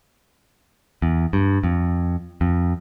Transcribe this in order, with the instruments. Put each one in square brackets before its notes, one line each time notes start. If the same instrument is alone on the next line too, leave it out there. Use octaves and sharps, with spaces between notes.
[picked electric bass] E2
G2
F2
F2